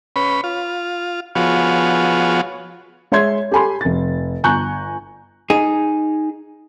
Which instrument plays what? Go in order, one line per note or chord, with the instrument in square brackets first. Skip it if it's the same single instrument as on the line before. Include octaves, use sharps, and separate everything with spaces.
[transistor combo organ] C#4 B4 B5
F4
F3 B3 F4 F#4 G#4 C#5
[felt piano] G#3 C#5 E5 C6 G#6
G4 A4 G#5 B5 C6
F1 A6
G1 G#5 A#5 C#6 F#6 G6
[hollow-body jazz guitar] D#4 G#4